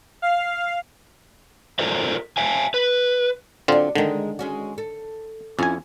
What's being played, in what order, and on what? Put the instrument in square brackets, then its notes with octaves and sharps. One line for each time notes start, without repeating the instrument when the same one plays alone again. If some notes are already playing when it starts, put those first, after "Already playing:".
[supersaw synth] F5
[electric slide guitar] F4 A4 A#4 C5 D5 E5
E5 F5 G#5
B4
[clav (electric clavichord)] D3 C4 F4 [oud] F#3 D4
[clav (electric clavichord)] D3 D#3 [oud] G#3 A#4
[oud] G#3 C#4 F#4
A4
[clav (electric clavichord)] F2 G#5 [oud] C#4 E4 F4